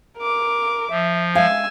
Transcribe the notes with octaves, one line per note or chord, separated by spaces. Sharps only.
A#4 D6
F3 E5
G#3 E5 F5 G#5 E6